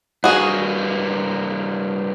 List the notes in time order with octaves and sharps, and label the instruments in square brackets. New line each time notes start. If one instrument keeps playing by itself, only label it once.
[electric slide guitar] G2 A#3 [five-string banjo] F#4 G#4